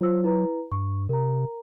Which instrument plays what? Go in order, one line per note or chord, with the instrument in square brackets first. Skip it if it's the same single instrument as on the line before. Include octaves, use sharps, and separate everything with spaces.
[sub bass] F#3 [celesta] F4 C5 E6
[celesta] E4 B4 A#5
[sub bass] G2 [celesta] C#6
[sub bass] C3 [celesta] A#4 A#5